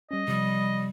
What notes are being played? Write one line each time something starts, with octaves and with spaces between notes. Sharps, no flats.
G3 C#4 D#5
C3 F3 G3 D#6